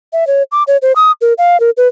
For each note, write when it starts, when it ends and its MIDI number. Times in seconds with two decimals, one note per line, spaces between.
0.13 0.27 76
0.27 0.43 73
0.52 0.63 86
0.67 0.77 73
0.82 0.92 72
0.96 1.12 87
1.21 1.33 70
1.38 1.60 77
1.60 1.70 70
1.77 1.88 71